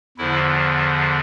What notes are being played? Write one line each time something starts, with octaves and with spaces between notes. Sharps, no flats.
E2 D3 F3 E4